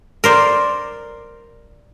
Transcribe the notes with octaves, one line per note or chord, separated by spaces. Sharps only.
A#4 C5 D5